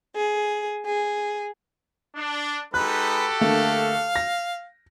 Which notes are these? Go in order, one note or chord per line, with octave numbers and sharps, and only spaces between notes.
G#4
G#4
D4
G#3 D#4 F#4 G4 A4 B4 F#6
D3 A3 A#3 F5
A#6